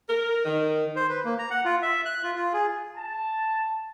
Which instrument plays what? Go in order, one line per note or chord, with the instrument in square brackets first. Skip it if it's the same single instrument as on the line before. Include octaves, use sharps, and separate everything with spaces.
[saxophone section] A#4
D#3
[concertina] C5
B4
A#3
A#5
F#5
F4
E5
F#6
F4
F4
G#4
[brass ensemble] A5